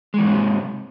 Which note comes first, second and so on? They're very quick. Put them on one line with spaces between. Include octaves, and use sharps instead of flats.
G#3 E3 G#2 F#3 C3